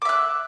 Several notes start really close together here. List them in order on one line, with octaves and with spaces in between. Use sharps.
D6 E5 F#6